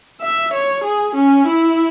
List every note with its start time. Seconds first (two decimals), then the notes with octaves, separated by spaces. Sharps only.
0.22 E5
0.53 C#5
0.84 G#4
1.15 C#4
1.47 E4